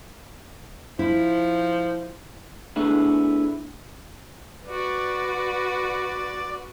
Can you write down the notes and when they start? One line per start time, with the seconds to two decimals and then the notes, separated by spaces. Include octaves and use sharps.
0.99 F3 E4
2.76 A3 B3 D4 E4 G#4
4.66 F#4 B4 D5